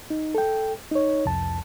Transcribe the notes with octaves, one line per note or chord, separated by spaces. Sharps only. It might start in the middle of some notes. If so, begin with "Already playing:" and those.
D#4
A4 G5
D#4 C#5
C2 F2 A5